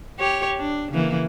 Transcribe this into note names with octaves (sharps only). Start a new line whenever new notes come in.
G4 C#5
D4
C#3 E3 A#3